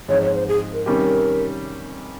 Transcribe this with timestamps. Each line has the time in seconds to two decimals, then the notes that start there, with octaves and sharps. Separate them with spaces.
0.08 G#2 F3 C4 D#4 C#5
0.22 C#5
0.35 C5
0.48 G#4
0.73 A#4
0.86 C3 D#3 G3 C#4 G4 A#4